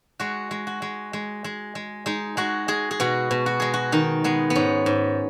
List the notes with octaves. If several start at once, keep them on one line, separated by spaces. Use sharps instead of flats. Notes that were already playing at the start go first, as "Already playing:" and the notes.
G#3 F#4
G#3
F#4
G#3
G#3
G#3
G#3
G#3 D#4
G#3 F#4
G#3 G#4
G#4
B2 F#4
B2
F#4
G#3 G#4
F#4
D#3 D#4
G#3 B3
B3
G#2 C#4
G#2